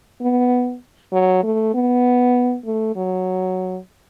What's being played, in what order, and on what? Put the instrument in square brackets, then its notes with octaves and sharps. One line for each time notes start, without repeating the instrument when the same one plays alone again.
[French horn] B3
F#3
A3
B3
A3
F#3